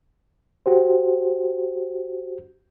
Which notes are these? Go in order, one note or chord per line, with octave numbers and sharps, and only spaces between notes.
F#4 G4 C5